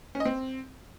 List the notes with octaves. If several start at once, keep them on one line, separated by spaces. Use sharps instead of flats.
C#4
D#5
C4